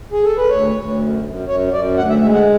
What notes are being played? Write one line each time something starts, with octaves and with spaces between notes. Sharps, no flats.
G#4
A4
B4
D2 C#5
D2
F#2
F#2
F#2 C#5
F#2 D5
D2 F#5
E5
G#3 E5
F#5